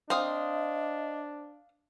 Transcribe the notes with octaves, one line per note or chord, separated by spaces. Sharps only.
C4 D4 D#5 F5 D#6